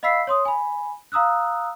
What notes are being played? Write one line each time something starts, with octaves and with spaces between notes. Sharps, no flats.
D#5 F5 B5 E6 B6 C7
C#5 C6 D#6
G#5 B5
F5 A#5 D#6 E6 F#6